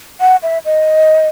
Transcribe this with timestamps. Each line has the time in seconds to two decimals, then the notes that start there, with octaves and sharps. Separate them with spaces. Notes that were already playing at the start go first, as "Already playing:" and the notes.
0.21 F#5
0.43 E5
0.65 D#5